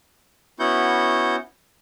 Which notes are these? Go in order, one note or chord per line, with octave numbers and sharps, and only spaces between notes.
B3 C#4 E4 F#4 F#5 G6